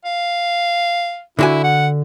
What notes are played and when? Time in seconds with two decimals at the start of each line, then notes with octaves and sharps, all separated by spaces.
0.05 F5
1.39 D3 E4 F#4 G#5
1.64 F#5